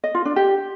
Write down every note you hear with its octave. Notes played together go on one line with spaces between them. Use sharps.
D#5
F4
D4
G4